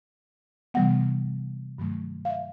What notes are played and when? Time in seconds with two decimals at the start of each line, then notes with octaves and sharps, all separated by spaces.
0.74 C3 E3 G3 B3 F#5
1.78 G2 D#3 F#3 A3
2.25 F5
2.30 E5